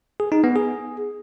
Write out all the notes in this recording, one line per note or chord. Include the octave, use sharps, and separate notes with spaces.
G#4
D#4
B3
G#4